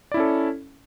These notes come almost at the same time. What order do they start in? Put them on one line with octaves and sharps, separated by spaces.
D5 E4 C#4 A4